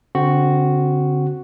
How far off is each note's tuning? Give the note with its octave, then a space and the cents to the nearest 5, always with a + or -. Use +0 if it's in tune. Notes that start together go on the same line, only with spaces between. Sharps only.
D3 -35 C4 +0 F#4 +0